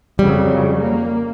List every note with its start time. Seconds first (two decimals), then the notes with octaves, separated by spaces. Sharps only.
0.19 F2 C#3 F#3 G3
0.80 A#3